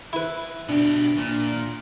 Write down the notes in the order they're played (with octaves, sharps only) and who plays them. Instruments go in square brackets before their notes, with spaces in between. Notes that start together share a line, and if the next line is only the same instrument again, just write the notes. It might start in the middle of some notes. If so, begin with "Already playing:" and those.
[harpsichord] E4 B4
[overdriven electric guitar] B2 G4 [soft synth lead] D4
[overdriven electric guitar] A#2